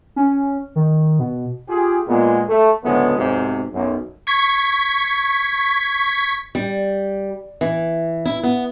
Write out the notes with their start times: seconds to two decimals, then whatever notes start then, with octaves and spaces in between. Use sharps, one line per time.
0.16 C#4
0.76 D#3
1.19 B2
1.68 F4 G4 G#4
2.07 A#2 G#3 B3
2.49 A3
2.84 D2 A2 C#3 F#3 G#3 B3
3.18 B1 G#2 C3
3.74 B1 F#2
4.27 C#6 G#6 B6
6.55 G3
7.61 E3
8.25 E4
8.43 B3